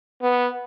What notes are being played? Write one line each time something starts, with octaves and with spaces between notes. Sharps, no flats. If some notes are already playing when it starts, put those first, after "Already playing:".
B3